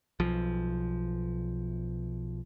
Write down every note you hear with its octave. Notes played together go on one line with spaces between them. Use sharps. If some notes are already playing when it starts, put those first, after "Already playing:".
B1 F3